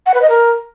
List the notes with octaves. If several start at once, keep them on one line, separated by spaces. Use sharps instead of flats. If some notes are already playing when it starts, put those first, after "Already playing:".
F#5
B4
D#5
A#4